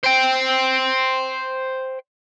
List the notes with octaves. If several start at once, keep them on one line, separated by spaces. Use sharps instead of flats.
C5 G5